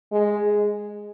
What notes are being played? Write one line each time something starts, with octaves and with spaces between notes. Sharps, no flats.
G#3